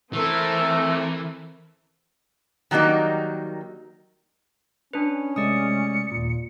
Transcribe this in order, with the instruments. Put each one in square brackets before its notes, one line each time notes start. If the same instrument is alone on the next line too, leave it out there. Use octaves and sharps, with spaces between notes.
[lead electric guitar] E3 [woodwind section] A3 [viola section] C4 A4 A#4
[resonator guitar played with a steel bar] D#3 F#3 G3 A#3 D#4
[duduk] C#4 [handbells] D4 B4
[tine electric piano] C3 G#3 A3 [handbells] D5 D#6 [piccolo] C#7
[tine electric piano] D#2 A#2